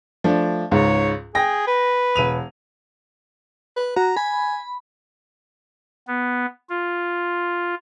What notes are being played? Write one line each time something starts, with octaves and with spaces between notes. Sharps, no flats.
F3 A3 D4
C#2 G#2 C#5
G#4 G5 A#6
B4
E1 D#7 F7
B4
F#4 A#5
G#5 B5
B3
F4